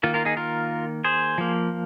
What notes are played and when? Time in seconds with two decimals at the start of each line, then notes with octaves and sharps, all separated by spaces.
0.03 D#3 A#3 F4
0.14 F4 A#4
0.25 D#4 G#4
0.37 F4 A#4
1.04 G#4 C5
1.38 F3 A#3